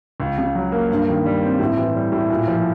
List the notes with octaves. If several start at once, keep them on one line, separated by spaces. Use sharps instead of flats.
C#2
C#3
F#3
A#3
G2
D#3
G3
C4
A2
E3
G3
A2
A#2
F3